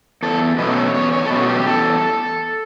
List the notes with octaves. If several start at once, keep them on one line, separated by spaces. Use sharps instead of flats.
E2 A4
B2 F#3 A3 C#4 B4
B4
C#5
E2 C#5
C#5
A4
B2 F#3 A3 C#4 B4
F#4
G4
E2 A4